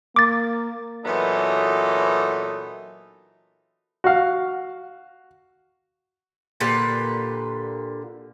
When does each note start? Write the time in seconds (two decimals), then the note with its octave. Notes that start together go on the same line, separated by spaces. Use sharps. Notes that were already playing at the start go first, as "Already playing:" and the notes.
0.16 A#3 D6 A6
1.05 A#2 E3 F#3 B3 D#4 A4
4.04 F#4 F5
6.60 A#2 D3 G4 B4